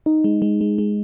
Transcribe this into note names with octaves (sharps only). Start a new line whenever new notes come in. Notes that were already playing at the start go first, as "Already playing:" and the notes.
D#4
G#3
G#3
G#3
G#3